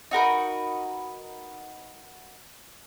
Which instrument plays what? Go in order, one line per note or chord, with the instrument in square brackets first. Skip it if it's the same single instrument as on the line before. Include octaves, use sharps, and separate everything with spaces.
[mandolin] D#4 F#4 A#4 B4